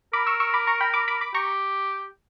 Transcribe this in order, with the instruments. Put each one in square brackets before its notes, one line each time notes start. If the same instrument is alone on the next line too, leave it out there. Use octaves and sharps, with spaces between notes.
[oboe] A#4 [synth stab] B5 D6
[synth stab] C#6 E6
C#6 E6
B5 D6
A#5 C#6
G5 B5
B5 D6
B5 D6
B5 D6
[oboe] G4 [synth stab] A#5 C#6